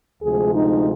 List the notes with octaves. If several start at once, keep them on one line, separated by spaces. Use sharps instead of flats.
D2 C3 F3 G#3 G#4
D#4